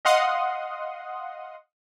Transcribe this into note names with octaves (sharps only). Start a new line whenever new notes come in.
D#5 F5 F#5 C6 D#6